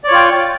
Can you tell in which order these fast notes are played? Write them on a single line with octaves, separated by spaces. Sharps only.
D5 C#5 F4 G5